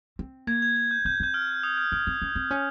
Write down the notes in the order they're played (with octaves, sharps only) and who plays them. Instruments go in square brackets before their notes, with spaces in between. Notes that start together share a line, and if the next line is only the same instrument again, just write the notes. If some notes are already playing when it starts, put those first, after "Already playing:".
[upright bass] C4
[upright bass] A#3 [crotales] G#6
[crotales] G#6
G#6
G6
[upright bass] C4 [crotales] G6
[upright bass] C4 [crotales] G6
[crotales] F6
D#6
F6
[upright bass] C4 [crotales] F6
[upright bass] C4
C#4
C4
C#4